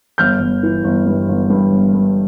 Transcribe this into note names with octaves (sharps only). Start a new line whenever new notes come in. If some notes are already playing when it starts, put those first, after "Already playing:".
G1 F6 G6
G1
E3
G1
G2
G1
G2
G1
G2